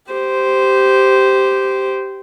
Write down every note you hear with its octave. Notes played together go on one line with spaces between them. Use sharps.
G4 C5